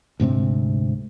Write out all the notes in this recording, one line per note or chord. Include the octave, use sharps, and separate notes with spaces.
D2 G#2 C3 C4